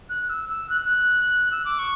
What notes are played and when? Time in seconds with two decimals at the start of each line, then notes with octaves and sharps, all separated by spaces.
0.09 F#6
0.29 E6
0.50 E6
0.70 F#6
0.85 F#6
1.52 E6
1.65 D6
1.79 C#6